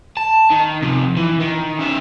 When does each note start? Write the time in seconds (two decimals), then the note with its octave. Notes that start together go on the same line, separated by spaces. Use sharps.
0.17 A5
0.51 D#3
0.82 C3 F3
1.17 E3
1.41 D#3
1.79 C#3 E5